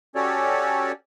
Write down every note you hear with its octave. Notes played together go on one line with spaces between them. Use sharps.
C#4 F#4 G4 A4 C#5 D5